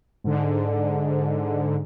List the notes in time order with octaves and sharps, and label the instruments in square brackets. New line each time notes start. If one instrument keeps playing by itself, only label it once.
[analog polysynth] G#2 D3